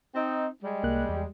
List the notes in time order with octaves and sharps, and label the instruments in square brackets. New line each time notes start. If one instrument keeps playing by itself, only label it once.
[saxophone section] C4 D#4
G3 G#3
[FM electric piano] C2 A#3 F#6
E2